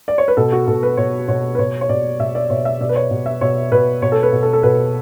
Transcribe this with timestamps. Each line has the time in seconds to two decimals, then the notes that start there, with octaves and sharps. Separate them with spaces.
0.08 D5
0.18 C#5
0.28 B4
0.37 B2 A4
0.52 F#4
0.67 B2 A4
0.83 B4
0.97 B2 C#5
1.28 B2 C#5
1.55 B4
1.59 B2 C#5
1.81 C#5
1.89 B2 D5
2.19 B2 E5
2.35 D5
2.50 B2 C#5
2.65 E5
2.80 B2 D5
2.89 B4
2.96 C#5
3.11 B2
3.26 E5
3.41 B2 C#5
3.72 B2 B4
4.02 B2 C#5
4.12 A4
4.23 B4
4.33 B2
4.43 A4
4.53 A4
4.63 B2 B4